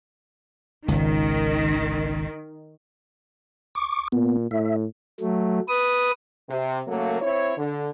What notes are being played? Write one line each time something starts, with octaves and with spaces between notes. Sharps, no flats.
G#1 C#2 D#3
C#6 D6
A#2 B3
A2 E5
F#3 A3
B4 D#6
C3
C#3 F#3 A3 A#3
C4 E4 C#5
D3